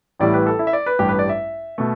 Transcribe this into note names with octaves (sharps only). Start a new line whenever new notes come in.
A1 A2 E3 G3 D5
B4
A4
E4
E5
D5
B4
A1 G2 G3 G4
B4
D5
E5
B2 A3